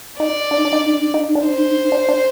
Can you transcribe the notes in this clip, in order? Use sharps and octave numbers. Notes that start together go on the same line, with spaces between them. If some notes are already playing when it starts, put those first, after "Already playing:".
D#4 D5
D4
D#4
D4
D#4
D4
D#4
D4
D#4
D4
D#4
D4
D#4
D4
D#4
D4 C5
D#4
D4
D#4
D4
D#4
D4
D4